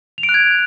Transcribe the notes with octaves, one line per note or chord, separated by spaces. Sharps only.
F7
D7
F#6
G#6